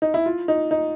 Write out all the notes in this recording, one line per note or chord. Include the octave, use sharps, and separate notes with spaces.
D#4
E4
F4
D#4
D#4